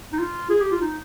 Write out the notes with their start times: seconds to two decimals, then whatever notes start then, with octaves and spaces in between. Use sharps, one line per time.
0.13 D#4
0.19 F4
0.50 G#4
0.60 G4
0.71 F4
0.81 D#4